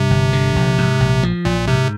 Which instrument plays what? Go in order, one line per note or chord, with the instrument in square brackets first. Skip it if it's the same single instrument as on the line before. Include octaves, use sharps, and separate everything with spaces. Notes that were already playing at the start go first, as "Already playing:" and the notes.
Already playing: [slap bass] G2 [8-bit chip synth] C3
[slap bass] G1
D3
A#1
G#2
A#1
F3
[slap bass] A#1 [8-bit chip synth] A#2
[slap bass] G#2 [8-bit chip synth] C3